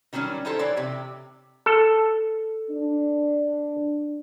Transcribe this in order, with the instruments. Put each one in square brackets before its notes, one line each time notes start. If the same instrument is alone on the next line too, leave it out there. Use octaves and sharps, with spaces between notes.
[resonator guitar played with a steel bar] D#3 F#3 G3 C4 C#4
D#4 E4 G4 A4 C5
E3 C#5 D5
C3 G4
[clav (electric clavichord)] A4
[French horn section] D4